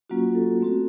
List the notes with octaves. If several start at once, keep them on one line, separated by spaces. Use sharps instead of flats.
F#3 A#3 C#4 F4 F#4
A4
A3 C4 F#4